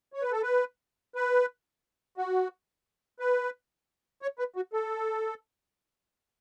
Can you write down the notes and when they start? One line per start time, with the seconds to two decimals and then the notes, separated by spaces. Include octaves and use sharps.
0.13 C#5
0.22 B4
0.32 A4
0.43 B4
1.15 B4
2.17 F#4
3.20 B4
4.22 C#5
4.39 B4
4.56 F#4
4.73 A4